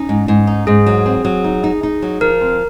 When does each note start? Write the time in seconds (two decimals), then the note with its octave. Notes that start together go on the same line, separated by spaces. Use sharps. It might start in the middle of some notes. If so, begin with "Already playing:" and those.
Already playing: C#4 D#4
0.09 G#2
0.28 G#2
0.47 D#4
0.67 G#2 G#4
0.86 F#3
1.06 C4
1.25 F#3
1.44 D#4
1.64 D#4
1.83 D#4
2.02 F#3
2.21 F3 A#4
2.41 C4